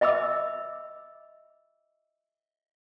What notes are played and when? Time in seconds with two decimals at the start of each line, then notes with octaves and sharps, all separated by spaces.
0.01 D#5 E5 B5 D6 E6